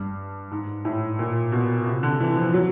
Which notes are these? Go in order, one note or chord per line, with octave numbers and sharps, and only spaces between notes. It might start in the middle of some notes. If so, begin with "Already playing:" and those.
Already playing: G2
G#2
A2
A#2
B2
C3
D3
E3
F3
F#3